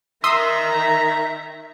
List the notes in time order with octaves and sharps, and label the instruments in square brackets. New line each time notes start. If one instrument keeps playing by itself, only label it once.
[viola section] D#3 [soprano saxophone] E5 [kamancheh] A#5 [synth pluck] C6 D#6 E6